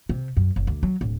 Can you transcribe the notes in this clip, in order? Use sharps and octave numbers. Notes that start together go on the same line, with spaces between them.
C3
F#2
F#1
D2
F#3
D1